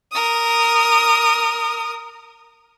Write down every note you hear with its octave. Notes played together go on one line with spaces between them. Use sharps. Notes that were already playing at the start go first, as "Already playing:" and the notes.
A#4 D#6